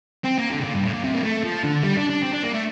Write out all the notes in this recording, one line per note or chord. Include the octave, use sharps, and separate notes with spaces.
C4
A#3
D3
C3
A#2
G2
A2
A#2
C3
A#3
A3
F3
D3
G3
D4
D4
C4
D4
A#3
A3